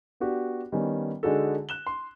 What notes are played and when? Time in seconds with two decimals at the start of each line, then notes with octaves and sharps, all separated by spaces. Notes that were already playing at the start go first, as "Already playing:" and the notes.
0.20 B3 D4 F#4 G4
0.72 D#3 G3 B3 C#4 D4
1.23 D3 G#3 D#4 F#4 G#4 A4
1.69 F#6 E7 G7
1.87 C6